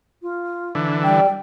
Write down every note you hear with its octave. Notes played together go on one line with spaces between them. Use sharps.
F4
D3 E3
G3 G5